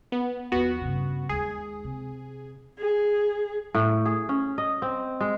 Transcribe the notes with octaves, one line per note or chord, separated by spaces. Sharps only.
B3
D#2 F3 B3 F#4
G2 C#3
D#2 G#3 G#4
C3
G#4
A2
G#4
C#4
D#5
C4
G#3